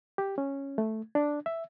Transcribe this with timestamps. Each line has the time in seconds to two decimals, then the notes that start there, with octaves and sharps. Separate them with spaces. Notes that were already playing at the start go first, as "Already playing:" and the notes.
0.18 G4
0.38 C#4
0.78 A3
1.15 D4
1.46 E5